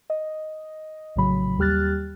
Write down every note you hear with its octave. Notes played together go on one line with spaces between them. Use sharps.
D#5
A#1 A2 C#3 F#3 B5
D#2 G3 G4 F6 F#6 A6